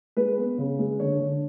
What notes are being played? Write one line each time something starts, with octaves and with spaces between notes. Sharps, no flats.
G#3 B4
B3
C#3
G#3
D3 C#5
D3